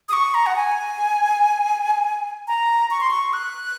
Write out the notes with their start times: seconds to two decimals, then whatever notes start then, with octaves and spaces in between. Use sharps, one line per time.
0.09 D#6
0.13 C#6
0.34 A#5
0.46 F#5
0.56 G#5
2.48 A#5
2.91 C#6
3.01 C6
3.11 C#6
3.33 F#6